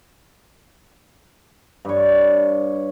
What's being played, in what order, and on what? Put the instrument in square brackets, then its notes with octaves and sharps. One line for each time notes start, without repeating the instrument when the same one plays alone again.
[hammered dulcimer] G2 C#5